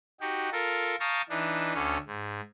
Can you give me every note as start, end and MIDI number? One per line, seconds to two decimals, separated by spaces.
0.20 0.50 63
0.20 0.50 66
0.20 0.50 67
0.52 0.96 65
0.52 0.96 69
0.52 0.96 70
1.00 1.22 77
1.00 1.22 79
1.00 1.22 81
1.00 1.22 82
1.00 1.22 85
1.00 1.22 87
1.29 1.73 52
1.29 1.73 62
1.29 1.73 63
1.74 1.97 38
1.74 1.97 50
1.74 1.97 61
2.07 2.41 44